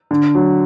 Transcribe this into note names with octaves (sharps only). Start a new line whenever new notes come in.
D3
F#3